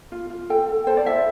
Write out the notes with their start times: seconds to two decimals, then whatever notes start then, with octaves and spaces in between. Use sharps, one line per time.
0.12 F4
0.30 F4
0.50 A4 G5
0.68 A4
0.87 A4 C5
0.97 D5
1.06 E4 E5